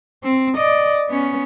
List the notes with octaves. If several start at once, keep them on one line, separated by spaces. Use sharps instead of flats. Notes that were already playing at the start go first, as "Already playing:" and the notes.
C4
D5 D#5
B3 C#4